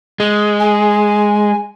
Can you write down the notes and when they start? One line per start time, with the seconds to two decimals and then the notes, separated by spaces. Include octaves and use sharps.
0.20 G#3
0.60 G#5